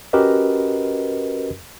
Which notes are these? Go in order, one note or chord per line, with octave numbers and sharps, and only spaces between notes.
C#4 F#4 G4 A#4 B4 D#5